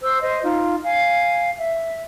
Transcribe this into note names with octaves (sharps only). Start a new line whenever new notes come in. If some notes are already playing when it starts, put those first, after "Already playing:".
C5 E6
C5 D#5
D#4 F4
F5 G#5
E5